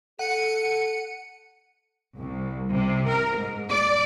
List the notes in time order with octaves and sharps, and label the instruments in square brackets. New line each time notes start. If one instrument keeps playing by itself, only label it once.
[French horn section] A4 [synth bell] F#5 [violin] C#7 D#7
[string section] C2
C3
A#4
G#2
D5